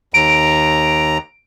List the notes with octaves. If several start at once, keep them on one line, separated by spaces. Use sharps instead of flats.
D#2 A#5 D7